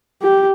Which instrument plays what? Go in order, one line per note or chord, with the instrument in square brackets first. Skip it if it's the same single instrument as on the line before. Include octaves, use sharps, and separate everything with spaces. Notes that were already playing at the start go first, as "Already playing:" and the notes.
[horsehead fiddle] G4